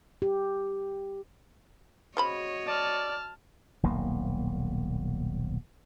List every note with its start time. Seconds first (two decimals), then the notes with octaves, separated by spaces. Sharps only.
0.22 G4
2.17 C#3 F#4 C5 C#5 D#5 B5
2.67 D5 A5 F6
3.83 D#1 B1 A#3